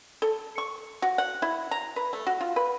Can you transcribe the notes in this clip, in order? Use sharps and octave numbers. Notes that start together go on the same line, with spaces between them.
A4
C#6
F#4
F#5
E4
A#5
B4
A3
F#4
F4
B4